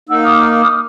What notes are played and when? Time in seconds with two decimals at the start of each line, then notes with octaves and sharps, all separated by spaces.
0.09 A#3 D#4 F#5 E6
0.23 D6 D#6 F6